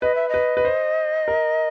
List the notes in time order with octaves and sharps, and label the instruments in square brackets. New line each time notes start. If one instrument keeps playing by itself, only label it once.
[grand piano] B4 [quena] D#5
[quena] E5
[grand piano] B4 [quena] D#5
[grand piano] B4
C5
A#4